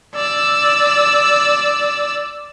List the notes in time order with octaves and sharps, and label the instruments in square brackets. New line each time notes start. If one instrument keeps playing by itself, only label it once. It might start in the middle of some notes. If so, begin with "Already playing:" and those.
[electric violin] D5 E6